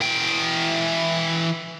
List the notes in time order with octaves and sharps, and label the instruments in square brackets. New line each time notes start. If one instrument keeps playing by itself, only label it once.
[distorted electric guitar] E3 G5